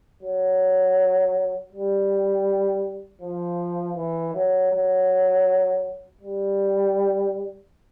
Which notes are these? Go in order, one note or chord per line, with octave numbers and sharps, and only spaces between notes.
F#3
G3
F3
E3
F#3
F#3
G3